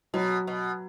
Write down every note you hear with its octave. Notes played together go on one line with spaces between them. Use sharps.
B2 F#3
B2